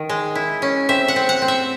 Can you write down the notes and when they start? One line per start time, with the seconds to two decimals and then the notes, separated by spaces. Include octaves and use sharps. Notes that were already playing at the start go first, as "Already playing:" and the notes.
Already playing: D#3
0.09 G#3
0.35 E4
0.62 C#4
0.89 C4 E5
1.08 F#5
1.16 C4
1.29 F#5
1.42 C4
1.48 E5